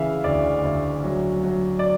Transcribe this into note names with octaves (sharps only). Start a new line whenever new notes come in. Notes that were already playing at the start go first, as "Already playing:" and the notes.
Already playing: C#3 E3 E5 F5
D2 D5
D2
F#3
F#3
D5